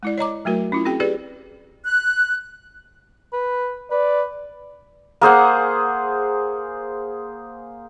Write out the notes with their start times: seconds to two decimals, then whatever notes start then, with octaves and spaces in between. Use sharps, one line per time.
0.03 G#3 E4 D5
0.18 C#5 D#5 A#5 D6
0.45 F#3 A3 F#4 A#4
0.72 C#4 E4 F4
0.85 C4 F#4 G#4 G5
1.00 G4 G#4 B4 D5
1.85 F#6
3.33 B4
3.91 B4 D5
5.21 A#3 G#4 C5 F#5